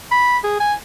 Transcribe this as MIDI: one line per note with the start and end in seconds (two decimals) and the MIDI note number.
0.11 0.38 83
0.44 0.56 68
0.60 0.74 80